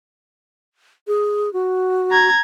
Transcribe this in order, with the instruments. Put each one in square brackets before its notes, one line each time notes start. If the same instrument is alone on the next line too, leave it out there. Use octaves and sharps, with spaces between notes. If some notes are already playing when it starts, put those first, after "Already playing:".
[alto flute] G#4
F#4
[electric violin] A#5 G#6